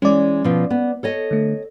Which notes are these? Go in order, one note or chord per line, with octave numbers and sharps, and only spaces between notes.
E3 G#3 C#4 D5
B2 F3
B3
A4 C#5 D#5
D3 A3